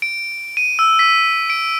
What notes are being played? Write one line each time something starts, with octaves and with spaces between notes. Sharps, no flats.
D7
D#7
E6
B6
D7